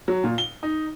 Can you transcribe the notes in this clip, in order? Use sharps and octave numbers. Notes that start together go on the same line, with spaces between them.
F#3
A#2
G7
D#4